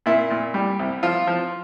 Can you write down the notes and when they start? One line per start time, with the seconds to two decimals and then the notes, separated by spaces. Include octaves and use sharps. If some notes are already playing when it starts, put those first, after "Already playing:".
0.06 A#2 E4
0.30 A#2
0.54 G3
0.79 C2
1.03 F3 F4
1.27 F3